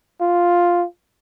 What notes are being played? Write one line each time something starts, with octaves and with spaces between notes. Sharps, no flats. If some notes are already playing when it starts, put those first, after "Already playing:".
F4